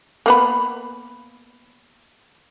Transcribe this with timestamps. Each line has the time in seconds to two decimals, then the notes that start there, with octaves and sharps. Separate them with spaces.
0.26 A#3 B3 B5